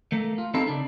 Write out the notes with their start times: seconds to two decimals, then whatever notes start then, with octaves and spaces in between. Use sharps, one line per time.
0.12 A3 A#3
0.38 F4
0.54 C4 D#4 E4 A4 A#4
0.67 C#3 D4